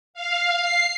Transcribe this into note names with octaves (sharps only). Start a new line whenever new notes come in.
F5
C7